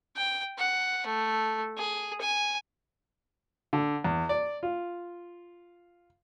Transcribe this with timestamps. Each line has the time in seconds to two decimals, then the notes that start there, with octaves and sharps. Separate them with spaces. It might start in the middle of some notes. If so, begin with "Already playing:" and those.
0.16 G5
0.58 F#5
1.06 A3
1.77 G#4
2.21 G#5
3.73 D3
4.04 E2
4.29 D5
4.63 F4